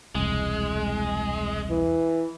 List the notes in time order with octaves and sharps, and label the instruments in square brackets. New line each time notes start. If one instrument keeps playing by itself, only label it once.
[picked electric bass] E1 C2 [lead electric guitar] G#3
[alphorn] E3